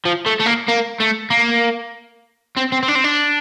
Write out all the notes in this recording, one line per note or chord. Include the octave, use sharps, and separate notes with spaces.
F3
A3
A3
A#3
A#3
A3
A#3
C4
C4
C4
D4
C4
D4